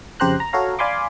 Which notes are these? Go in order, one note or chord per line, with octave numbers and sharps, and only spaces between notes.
F2 C#3 G4 C5 A#5 F#6
A#5
F#4 A4 C#5 F5 A#5
D5 F5 G#5 B5 C6 D6